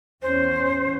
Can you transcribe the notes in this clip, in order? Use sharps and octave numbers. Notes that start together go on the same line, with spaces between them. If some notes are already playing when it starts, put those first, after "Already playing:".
E2 C#4 C5